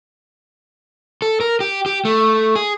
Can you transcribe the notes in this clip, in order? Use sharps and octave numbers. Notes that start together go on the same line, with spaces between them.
A4
A#4
G4
G4
A3
G#4